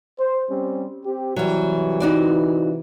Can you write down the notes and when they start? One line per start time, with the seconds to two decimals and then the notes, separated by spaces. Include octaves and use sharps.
0.19 C5
0.49 G3 C4 C#4
1.04 C4 G4
1.36 C3 E3 F#3 G3
2.00 D#4 F#4 D5